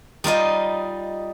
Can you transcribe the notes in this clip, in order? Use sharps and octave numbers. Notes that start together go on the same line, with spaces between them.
G3 D#4 F4 D#5